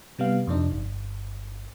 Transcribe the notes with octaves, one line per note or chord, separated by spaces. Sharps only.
C3 G3 B3 F5
F2 C3 D4 D#4
G1